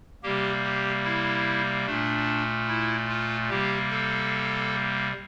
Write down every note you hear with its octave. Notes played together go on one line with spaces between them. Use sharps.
C3 G3 A#3 G4
G4
E4
A#2 A3 D4
E4
F4
C3 G3 A#3 G4
A4